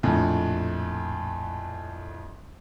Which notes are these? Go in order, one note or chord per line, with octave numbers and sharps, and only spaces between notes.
A#1 F2 A2